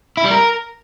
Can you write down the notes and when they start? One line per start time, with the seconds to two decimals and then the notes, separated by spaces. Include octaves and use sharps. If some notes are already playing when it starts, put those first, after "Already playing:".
0.17 E4
0.24 G3
0.31 A#4